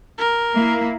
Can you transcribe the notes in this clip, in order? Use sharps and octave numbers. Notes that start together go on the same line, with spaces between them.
A#4
A#3 E4